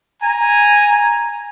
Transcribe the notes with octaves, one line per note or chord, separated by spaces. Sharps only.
G#5 A#5